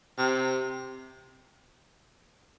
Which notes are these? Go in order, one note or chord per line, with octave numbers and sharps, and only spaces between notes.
C3